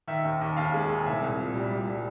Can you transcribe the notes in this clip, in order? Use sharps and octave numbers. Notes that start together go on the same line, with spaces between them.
D#3 E5
D#2
D#2
D#2 F5
G#3
D#2
C2 E5
C2
A#2
G3
G3
G3